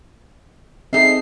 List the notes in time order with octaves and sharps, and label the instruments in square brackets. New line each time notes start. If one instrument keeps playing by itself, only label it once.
[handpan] C4 G#4 A4 [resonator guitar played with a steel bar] D#4 E5 [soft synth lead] C7